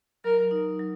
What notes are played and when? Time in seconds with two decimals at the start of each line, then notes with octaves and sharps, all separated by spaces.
0.24 F#3 A#4
0.51 D#4
0.79 F#3